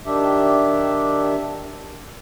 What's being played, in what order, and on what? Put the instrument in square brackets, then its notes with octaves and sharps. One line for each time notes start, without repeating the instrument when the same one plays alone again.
[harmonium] D#3 D4 G4 E5